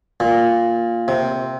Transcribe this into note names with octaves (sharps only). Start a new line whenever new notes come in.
A#2
C3